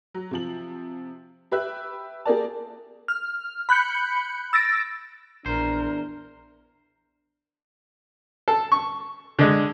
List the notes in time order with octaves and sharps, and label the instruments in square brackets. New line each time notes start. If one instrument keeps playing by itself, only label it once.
[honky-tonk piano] F#3
C3 F3 F#7
G4 B4 E5 F#6
A#3 G4 G#4 A#4 D5 A5
[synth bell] F6
B5 F#6 G6 C#7
E6 A6 A#6 D7
[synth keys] A#1 [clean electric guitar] E2 C5 [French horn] D4 [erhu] A#4
[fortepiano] A4
C#6
D3 G#3